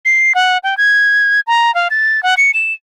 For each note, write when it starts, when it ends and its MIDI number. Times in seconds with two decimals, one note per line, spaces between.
0.05 0.33 96
0.35 0.58 78
0.64 0.77 79
0.77 1.40 92
1.47 1.73 82
1.75 1.88 77
1.90 2.23 93
2.23 2.34 78
2.37 2.51 97
2.54 2.73 100